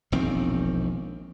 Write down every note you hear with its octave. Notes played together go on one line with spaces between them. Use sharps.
E1 A#1 D#3 C4